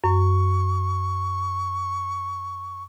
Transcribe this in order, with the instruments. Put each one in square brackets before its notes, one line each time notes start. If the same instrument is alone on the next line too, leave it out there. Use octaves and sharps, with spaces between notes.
[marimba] F#2 [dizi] C#6